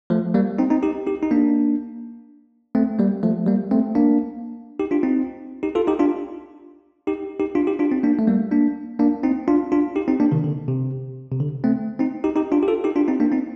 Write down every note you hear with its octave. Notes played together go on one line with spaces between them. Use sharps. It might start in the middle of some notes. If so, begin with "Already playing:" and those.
F3 A3
G3 A#3
C4 D#4
C4 D#4
D#4 G4
D#4 G4
D#4
A#3 D4
A3 C4
G3 A#3
F3 A3
G3 A#3
A3 C4
A#3 D4
D#4 G4
D4 F4
C4 D#4
D#4 G4
F4 A4
D#4 G4
D4 F4
D#4 G4
D#4 G4
D4 F4
D#4 G4
D4 F4
C4 D#4
A#3 D4
A3
G3 A#3
A#3 D4
A#3 D4
C4 D#4
D4 F4
D4 F4
D#4 G4
C4 D#4
A#3 D4
C3 D#3
D3
C3
C3
D3
A3 C4
C4 D#4
D#4 G4
D#4 G4
D4 F4
G4
F4 A4
D#4 G4
D4 F4
C4 D#4
A#3 D4
C4 D#4